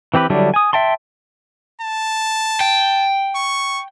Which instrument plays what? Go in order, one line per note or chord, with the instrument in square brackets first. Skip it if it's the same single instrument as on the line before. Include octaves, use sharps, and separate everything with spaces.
[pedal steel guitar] E3 C4 G4 B4
D3 F#3 G3 D4 E4
G#5 D#6
E5 G5 A5 C6
[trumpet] A5
[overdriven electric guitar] G5
[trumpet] C#6